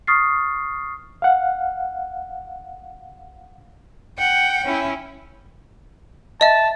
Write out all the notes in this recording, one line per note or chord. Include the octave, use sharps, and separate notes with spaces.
C#6 D#6 F6 A6 C7
F5 F#5
F#5 G5
C#4 E4
D#5 E5 A5